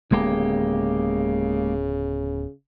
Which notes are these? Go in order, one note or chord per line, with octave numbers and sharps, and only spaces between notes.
D1 C#3 G#3 A#3 B3 G4